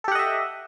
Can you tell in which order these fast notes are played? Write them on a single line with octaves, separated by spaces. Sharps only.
A4 G4 F#5 D#5 E5